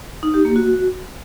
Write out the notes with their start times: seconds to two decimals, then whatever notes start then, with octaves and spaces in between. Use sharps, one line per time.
0.23 D#4
0.34 G4
0.45 A#3
0.56 F#4